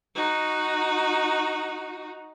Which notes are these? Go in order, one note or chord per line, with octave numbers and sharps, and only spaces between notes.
D#4 F#4